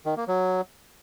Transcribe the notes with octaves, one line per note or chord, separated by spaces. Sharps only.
D#3
A#3
F#3